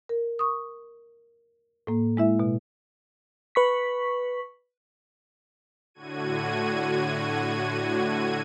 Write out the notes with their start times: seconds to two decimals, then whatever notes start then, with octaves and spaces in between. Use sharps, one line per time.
0.09 A#4
0.39 C#6 D#6
1.87 A2 A#3
2.17 G#3 E4 E5
2.40 B2
3.55 B4 C#6 B6
5.94 A2 D3 F#4 G#6 D#7